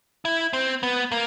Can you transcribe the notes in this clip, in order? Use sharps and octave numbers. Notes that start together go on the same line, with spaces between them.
E4
C4
B3
A#3